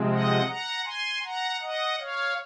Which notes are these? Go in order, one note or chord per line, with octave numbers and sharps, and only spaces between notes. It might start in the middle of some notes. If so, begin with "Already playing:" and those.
Already playing: C3 F3 G#3 C4
D#5 F#5
F#5 A#5
G#5 C6
F#5 A#5
D#5 F#5
C#5 F5